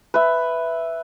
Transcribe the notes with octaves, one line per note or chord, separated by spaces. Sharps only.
B4 E5